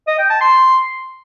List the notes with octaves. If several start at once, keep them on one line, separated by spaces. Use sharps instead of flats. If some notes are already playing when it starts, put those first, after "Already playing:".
D#5
G5
A5
C6